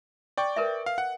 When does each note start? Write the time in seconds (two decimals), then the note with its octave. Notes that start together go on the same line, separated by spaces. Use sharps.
0.37 D5 G5 C#6
0.56 A#4 B4 E5
0.86 F5
0.98 F#5